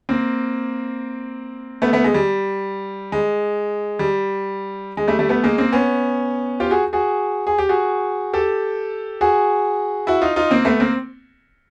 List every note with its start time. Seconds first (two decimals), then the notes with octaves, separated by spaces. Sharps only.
0.09 A#3 C4
1.82 A3 B3
1.93 A3 B3
2.04 G#3
2.14 G3
3.12 G#3
3.99 G3
4.97 G#3
5.08 G3 A3
5.19 G3 A3
5.29 A3 B3
5.44 G#3 A#3
5.58 A#3 C4
5.73 B3 C#4
6.60 F4 G4
6.71 F#4 G#4
6.93 F#4 G#4
7.47 G#4
7.58 G4
7.69 F#4 G#4
8.33 G4 A4
9.21 F#4 G#4
10.07 E4 F#4
10.21 D#4 F4
10.36 D#4 F4
10.51 A#3 C4
10.65 A3 B3
10.80 A#3 C4